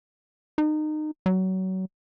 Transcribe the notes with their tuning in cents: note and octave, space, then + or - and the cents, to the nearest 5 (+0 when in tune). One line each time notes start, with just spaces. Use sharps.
D#4 -25
F#3 +25